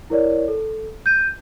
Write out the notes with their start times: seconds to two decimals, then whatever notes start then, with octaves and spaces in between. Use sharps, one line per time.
0.10 E4 A#4 C#5 D5
0.48 A4
1.06 G6 D#7